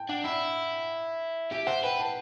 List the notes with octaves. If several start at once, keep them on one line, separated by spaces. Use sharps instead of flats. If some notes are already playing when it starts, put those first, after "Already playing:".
Already playing: G5 A5
D4 F#5
E4
G4 E5
C5 F#5
B4 G5
A5